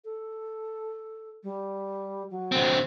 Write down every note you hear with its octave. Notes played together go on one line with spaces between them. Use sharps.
A4
G3
F#3
D3 C4